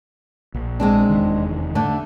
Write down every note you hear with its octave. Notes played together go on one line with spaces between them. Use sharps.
A#1
G#3 C4 D4
F1 E2 D#3
D3 A3 D4